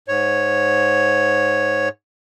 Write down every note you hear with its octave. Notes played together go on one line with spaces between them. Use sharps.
G#2 C#5